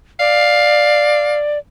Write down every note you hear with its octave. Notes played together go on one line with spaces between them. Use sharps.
D5 F5